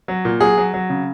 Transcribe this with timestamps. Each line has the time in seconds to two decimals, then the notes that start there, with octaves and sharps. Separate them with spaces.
0.08 F#3
0.25 A#2
0.41 F#3 G#4
0.58 F#3
0.74 F#3
0.89 C#3